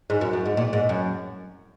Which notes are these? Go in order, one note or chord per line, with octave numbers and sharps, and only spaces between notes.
G#2
F#2
F#2
G#2
A#2
G#2
F#2